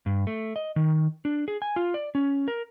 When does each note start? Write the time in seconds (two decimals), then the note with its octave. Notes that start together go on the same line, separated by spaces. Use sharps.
0.06 G2
0.27 A3
0.56 D#5
0.76 D#3
1.25 D4
1.48 G#4
1.62 G#5
1.76 F4
1.94 D5
2.15 C#4
2.48 A#4